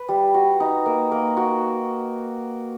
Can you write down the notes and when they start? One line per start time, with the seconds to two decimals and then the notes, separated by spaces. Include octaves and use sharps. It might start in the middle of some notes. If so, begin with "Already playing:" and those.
Already playing: B4
0.09 G3
0.34 F#4
0.60 D#4
0.86 A#3
1.12 A#3
1.37 F#4